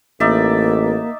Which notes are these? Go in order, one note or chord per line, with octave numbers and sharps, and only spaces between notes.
A1 A#3 D#4 D5 E5